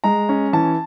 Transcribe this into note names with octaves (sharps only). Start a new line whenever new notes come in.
G#3 A#5
C#4
E3 A5